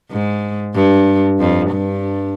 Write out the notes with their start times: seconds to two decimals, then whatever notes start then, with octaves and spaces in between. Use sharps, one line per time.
0.11 G#2
0.75 G2
1.39 F2
1.71 G2